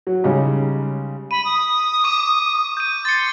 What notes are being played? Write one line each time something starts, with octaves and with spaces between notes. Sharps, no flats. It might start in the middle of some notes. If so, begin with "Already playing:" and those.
F#3
C#3 G3 G#3 D#4
B5 D#7
D#6
C#6 D6 D#7
G6 D#7
C6 A6 C#7